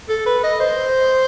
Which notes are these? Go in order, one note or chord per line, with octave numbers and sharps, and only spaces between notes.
A4
B4
D#5
C5